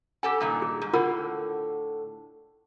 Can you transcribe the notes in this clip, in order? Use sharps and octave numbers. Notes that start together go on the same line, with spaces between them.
G4 A4 F#5 G#5
G2 A#2 D#3
G#4
G#2
A2 D3 F4 A#4 F#5